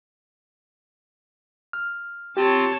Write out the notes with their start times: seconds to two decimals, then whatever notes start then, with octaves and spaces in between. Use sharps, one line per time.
1.73 F6
2.37 C4 F4 G4 C#5 A5